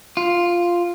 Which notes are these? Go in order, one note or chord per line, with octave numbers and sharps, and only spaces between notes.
F4